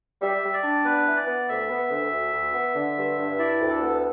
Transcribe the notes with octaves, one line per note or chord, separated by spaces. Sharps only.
G3 E5
G3
D5
D4
B3 B4
E3
D5
B3
D2 E5
B3
D2
D2
D2
B3
D3
G2
G2
E4 D5
D2
A4
B3